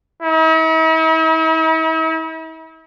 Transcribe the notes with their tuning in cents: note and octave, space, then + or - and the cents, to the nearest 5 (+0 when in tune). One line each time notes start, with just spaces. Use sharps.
E4 -45